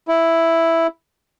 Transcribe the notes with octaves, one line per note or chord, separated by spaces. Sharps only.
E4